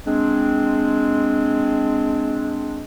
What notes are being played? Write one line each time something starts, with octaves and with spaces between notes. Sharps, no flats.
G#3 C4 D4